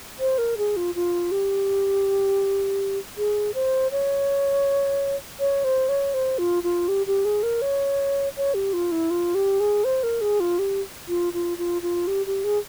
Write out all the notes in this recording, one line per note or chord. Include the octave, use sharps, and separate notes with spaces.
C5
A#4
G#4
F4
F4
G4
G#4
C5
C#5
C#5
C5
C#5
C5
F4
F4
G4
G4
G#4
A#4
C#5
C#5
G4
F4
E4
F4
G4
G#4
C5
A#4
G#4
F4
G4
F4
F4
F4
F4
G4
G4
G#4